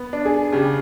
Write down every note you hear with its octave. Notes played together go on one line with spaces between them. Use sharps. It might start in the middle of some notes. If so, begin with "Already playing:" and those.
Already playing: B3 B4
D4
G#4
C#3 G4